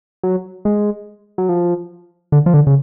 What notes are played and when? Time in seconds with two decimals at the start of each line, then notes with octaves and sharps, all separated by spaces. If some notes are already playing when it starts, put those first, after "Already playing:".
0.23 F#3
0.65 G#3
1.38 F#3
1.49 F3
2.32 D3
2.46 F3
2.54 D3
2.67 C#3